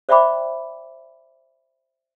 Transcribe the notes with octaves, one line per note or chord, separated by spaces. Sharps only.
C5 D5 E5 G5 B5 D6